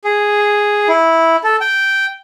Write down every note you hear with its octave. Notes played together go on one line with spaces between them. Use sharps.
G#4
E4
A4
G5